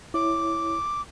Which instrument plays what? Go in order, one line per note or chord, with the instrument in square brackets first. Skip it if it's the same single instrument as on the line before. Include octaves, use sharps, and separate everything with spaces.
[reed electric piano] E4 C#5 [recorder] D6